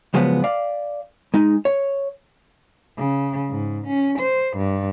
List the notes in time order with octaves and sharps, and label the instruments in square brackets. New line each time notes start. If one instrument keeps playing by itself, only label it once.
[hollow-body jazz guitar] C#3 F3 F#3 G#3 B3
D5 F5
G#3 D#4
C#5
[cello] C#3
G#2
C#4
C5
G2